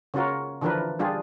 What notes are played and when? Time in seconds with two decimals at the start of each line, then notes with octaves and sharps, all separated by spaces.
0.14 C#3 C#4 F4 F#4 A#4
0.61 D3 E3 F3 D4 A#4 B4
0.99 G3 D4 F4 G4 G#4